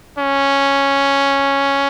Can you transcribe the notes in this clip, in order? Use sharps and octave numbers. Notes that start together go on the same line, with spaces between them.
C#4